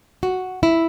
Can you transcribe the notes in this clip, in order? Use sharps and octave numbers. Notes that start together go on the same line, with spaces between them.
F#4
E4